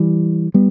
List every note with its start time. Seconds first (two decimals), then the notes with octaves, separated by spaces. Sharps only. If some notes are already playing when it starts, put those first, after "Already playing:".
Already playing: E3 G3
0.54 G3 B3